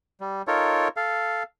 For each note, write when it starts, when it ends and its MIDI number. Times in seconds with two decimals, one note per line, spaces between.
0.21 0.42 55
0.48 0.88 63
0.48 0.88 65
0.48 0.88 69
0.48 0.88 70
0.48 0.88 73
0.97 1.43 69
0.97 1.43 77